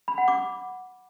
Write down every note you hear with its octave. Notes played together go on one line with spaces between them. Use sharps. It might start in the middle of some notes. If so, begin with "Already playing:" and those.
B5
F#5
D6